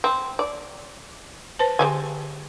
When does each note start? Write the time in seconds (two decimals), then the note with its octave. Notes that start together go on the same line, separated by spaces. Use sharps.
0.04 C4
0.39 D5
1.59 B4 C5 A5
1.79 D3 G#3 G4 G#5